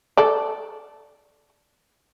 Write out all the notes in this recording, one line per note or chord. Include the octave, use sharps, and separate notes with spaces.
A4 D5